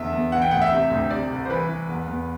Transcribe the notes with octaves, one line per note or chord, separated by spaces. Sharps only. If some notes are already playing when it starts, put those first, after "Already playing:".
Already playing: E2 D3 E5
E2
E3 F#5
G5
D2 F#5
E5
C3
D2
C3 D5
C2
C5
E3 B4
E3
E2
E2